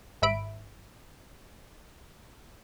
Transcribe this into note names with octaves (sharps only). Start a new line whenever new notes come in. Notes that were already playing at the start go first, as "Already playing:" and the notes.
G#1 E5 B5 D7